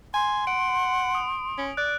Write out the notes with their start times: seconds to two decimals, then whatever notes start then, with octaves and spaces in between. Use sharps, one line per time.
0.14 G#5 C6
0.47 F#5 D7
1.15 D#6
1.58 C#4
1.77 D5 F#6